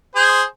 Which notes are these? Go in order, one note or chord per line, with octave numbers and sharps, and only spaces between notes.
G#4 C5